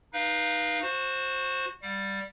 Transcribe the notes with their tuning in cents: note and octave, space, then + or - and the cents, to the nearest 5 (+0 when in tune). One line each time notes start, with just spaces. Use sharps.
D#4 +0 B4 -30 F5 +0
F#4 -15 C5 +10
G3 +0 F#5 -45